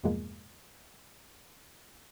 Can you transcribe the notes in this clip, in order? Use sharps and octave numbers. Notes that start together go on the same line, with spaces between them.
E2 G2 B2 F3 G#3 A#3